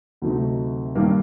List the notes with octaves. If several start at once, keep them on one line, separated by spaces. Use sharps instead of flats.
D2 C3 F#3 A3 D#4
G2 D#3 G3 A#3